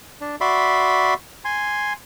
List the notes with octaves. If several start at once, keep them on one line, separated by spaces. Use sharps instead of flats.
D4
F#4 D5 E5 B5 C6
G#5 C6